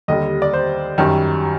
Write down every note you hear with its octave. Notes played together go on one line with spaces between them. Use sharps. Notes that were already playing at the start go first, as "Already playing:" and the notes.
D#2 D3 G3 D#5
D5
C5
F#2 D#3 G3